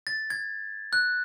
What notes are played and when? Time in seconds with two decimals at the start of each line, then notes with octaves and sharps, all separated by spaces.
0.07 A6
0.30 G#6
0.93 F#6